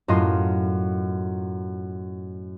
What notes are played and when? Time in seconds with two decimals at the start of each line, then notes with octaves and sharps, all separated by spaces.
0.08 F#2 A2 F4 D#5 C6